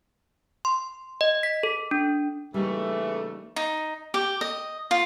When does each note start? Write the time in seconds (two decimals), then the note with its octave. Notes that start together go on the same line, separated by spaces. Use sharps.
0.65 C6
1.21 D#5
1.43 B6
1.63 A4
1.91 D4
2.54 C#3 E3 G3 A3 A#3 D#4
3.56 D#4
4.14 G4
4.41 D#5
4.91 F4